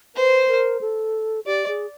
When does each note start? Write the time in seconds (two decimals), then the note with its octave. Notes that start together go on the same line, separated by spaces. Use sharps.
0.15 B4 C5
0.48 A#4
0.81 A4
1.46 G4 D5
1.68 G#4